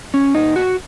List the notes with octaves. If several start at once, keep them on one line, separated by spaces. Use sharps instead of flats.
C#4
A#2 D#4
F#4